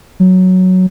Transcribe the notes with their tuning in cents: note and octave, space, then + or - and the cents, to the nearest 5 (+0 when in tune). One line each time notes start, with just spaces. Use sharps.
F#3 +0